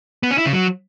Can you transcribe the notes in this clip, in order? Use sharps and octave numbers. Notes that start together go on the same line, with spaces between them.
B3
C#4
E4
C#3
F#3